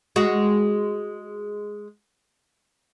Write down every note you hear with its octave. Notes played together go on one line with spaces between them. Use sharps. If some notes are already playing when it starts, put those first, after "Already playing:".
G#3 F#4